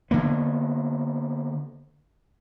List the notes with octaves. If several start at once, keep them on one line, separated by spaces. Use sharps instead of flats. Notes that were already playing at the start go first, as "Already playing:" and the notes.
D3 A#3 B3